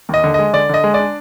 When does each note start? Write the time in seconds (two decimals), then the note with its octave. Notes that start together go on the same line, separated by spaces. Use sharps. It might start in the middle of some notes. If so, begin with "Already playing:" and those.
0.09 D#2 D#5
0.24 D3
0.34 G#3 D#5
0.53 D3 D5
0.69 D3 D#5
0.84 G#3
0.94 D4 D5